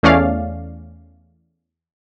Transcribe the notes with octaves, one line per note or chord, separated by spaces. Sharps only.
E2 A3 C#4 D5 F5